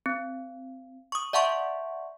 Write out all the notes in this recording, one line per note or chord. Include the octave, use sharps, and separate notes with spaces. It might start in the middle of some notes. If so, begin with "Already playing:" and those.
C4
C#6 D#6
D5 E5 F#5 A5 C6 C#6